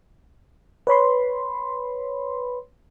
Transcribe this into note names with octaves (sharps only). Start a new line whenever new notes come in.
B4 C#5 B5 C6